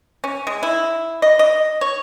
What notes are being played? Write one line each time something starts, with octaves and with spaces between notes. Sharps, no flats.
C#4
G#3
E4
D#5
D#5
C#5